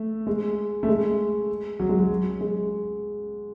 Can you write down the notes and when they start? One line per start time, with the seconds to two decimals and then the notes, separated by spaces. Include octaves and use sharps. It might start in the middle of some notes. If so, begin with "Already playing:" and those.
Already playing: A3
0.27 G#3
0.83 A3
0.88 G#3
1.80 F#3
1.89 G#3
1.99 F#3
2.41 G#3